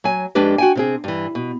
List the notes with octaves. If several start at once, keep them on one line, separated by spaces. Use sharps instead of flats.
F#3 G#5
F2 G#3 D4 G4 B4
F#4 G5 G#5
C3 C4 G#4
G2 E3
B2